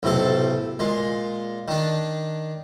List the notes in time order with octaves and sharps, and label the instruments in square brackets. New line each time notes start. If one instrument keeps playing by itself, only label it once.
[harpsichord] B1 A2 C3 A4
A#2 G#3
D#3 D4